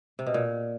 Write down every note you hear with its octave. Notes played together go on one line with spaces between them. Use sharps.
C3
B2
A#2